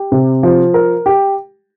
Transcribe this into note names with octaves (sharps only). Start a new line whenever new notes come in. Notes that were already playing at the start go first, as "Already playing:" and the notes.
Already playing: G4
C3
F3
A#4
G4